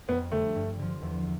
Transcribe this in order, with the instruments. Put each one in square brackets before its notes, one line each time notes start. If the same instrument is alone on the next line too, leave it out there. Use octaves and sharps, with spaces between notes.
[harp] F2 [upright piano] B3
[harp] D3 G3 [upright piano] A3
[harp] G2
D3 F3
E2